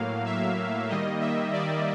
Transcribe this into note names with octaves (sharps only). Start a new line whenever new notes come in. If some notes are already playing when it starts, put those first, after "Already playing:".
Already playing: A2 F#3 A#3 F5
E5
D#3 G3 A#3 D#5
E5
D5